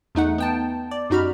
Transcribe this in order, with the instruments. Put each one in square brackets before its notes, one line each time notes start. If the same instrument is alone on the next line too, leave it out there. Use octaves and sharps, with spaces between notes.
[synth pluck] E2 A3 D#4 F#5
B3 G5 A5
D5
F#2 G3 D#4 F#4 B5 F6